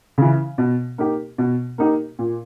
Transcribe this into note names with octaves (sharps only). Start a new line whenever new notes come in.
C#3 E3
B2
A#3 D#4 G4
B2
A#3 D#4 G4
A#2